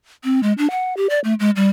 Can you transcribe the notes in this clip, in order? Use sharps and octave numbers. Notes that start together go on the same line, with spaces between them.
C4
G#3
D4
F#5
G4
D5
A3
G#3
G3